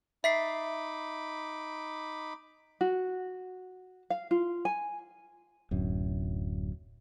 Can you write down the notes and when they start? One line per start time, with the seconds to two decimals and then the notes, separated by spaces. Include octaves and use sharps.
0.24 D#4 E5 B5 D6 B6 C7
2.81 F#4
4.10 F5
4.31 F4
4.65 G#5
5.71 D1 F#2